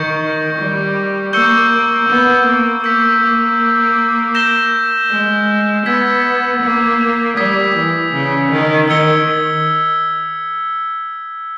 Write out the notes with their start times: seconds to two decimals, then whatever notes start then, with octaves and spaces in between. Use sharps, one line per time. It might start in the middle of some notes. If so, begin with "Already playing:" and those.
Already playing: D#3 C#6 G6 A#6 C#7
0.58 G3
1.33 A#3 C#6 E6 G6 C#7 G7
2.09 B3
2.46 A#3
2.84 A#3 E6 G6 B6
3.21 A#3
4.35 G6 A#6 E7 G7
5.11 G#3
5.86 B3 E6 G#6 B6
6.62 A#3
7.37 G3 D#6 G#6 B6
7.75 E3
8.13 C#3
8.51 D#3
8.88 D#3 E6 G#6 C#7 G7